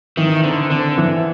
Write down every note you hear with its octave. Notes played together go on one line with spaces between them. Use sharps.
D#3 E3
D3 C4
D3 C4
E3